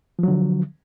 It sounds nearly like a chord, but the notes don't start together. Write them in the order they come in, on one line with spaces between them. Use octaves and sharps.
F3 F#3 D3